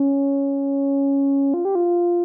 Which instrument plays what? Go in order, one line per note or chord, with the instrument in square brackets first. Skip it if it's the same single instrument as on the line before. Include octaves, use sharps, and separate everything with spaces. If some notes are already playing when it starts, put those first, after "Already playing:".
Already playing: [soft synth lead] C#4
F4
G4
F4